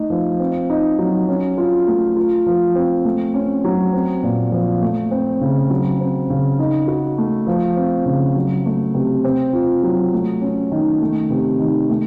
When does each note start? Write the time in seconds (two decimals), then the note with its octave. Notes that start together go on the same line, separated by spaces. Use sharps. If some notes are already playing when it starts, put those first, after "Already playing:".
Already playing: A3 D#4
0.10 F3
0.40 C4
0.70 D#4
0.99 F#3
1.28 C#4
1.58 F4
1.87 A3
2.17 F4
2.46 F3
2.75 C4
3.05 A3
3.34 C#4
3.64 F#3
3.93 C4
4.23 A#2
4.52 F3
4.82 A3
5.11 C4
5.41 C#3
5.70 F#3
6.00 C4
6.30 C#3
6.59 D#4
6.88 F#4
7.18 A3
7.47 F3
7.76 C4
8.06 C#3
8.35 F#3
8.66 A3
8.94 C3
9.24 C4
9.53 F4
9.83 F#3
10.13 A3
10.41 C#4
10.72 D#3
11.01 A3
11.30 C3
11.59 D#3
11.89 A3